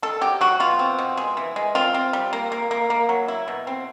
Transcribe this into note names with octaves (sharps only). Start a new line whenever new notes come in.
D#3 A4
F#3 G4
F#3 F#4
B2 F4
C4
B2
G#3
E3
G#3
C4 F4
C4
G3
A#3
A#3
A#3
A#3
F#3
E4
B2
C4